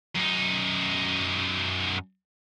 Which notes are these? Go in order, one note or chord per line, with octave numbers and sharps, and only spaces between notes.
F#2 D#4